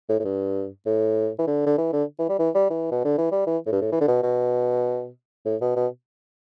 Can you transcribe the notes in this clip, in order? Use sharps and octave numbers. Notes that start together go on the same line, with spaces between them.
A2
A2
G2
A2
E3
D3
D3
E3
D3
E3
G3
E3
G3
E3
B2
D3
E3
G3
E3
A2
G2
A2
E3
D3
B2
B2
A2
B2
B2